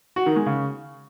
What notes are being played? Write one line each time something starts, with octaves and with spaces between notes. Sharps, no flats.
F#4
D#3
G#3
C#3